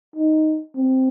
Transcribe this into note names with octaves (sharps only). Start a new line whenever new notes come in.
D#4
C4